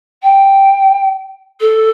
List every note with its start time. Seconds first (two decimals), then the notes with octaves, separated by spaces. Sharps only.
0.23 G5
1.60 A4